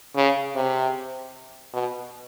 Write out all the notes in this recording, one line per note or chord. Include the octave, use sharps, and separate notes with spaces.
C#3
C3
B2